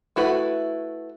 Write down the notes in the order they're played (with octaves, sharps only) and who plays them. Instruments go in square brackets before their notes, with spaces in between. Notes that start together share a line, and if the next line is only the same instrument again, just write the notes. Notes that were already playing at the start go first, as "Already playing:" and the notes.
[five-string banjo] A3 E4 F#4 B4